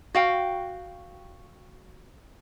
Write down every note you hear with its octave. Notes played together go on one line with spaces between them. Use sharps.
F#4 F5 G5